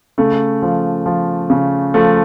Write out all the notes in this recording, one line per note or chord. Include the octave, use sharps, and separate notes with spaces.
C#3 A3
F3
F3
C#3
F3 A3